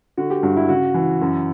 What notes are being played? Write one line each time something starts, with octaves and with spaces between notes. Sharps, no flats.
D3 F#4
G4
G2 F#4
E4
C#3 F#4
E3
F#2